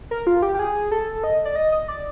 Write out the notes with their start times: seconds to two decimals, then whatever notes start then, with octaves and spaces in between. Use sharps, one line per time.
0.11 A#4
0.27 F4
0.42 G4
0.55 G4
0.59 G#4
0.92 A4
1.24 D#5
1.45 D5
1.56 D#5
1.72 D#5
1.88 D5